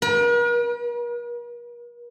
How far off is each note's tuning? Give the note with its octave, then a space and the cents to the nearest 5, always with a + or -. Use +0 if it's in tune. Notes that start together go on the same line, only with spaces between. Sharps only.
A#4 +45